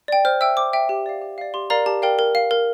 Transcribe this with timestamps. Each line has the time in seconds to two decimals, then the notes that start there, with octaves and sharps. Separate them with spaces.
0.08 D5 G5
0.25 C5 F6
0.41 E5 G5 E6
0.57 C5 D6
0.73 E5 G5
0.89 G4
1.06 D5 F5
1.22 G4
1.38 D5 F5
1.54 G4 C6
1.70 A#4 D5 F5 A#5
1.86 G4 A5
2.02 A#4 D5 F5 G5
2.19 A#4
2.35 F5
2.51 A#4